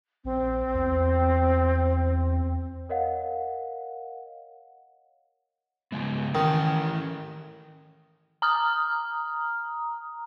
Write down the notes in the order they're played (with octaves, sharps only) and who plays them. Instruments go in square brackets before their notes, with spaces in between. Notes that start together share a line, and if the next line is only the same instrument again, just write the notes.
[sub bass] A#1 [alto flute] C4
[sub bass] E2
[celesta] A#4 C#5 D#5 F5 F#5
[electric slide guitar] C#3 G#3 B3
[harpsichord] D#3 [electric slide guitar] E3 C#4
[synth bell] A#5 D#6 F6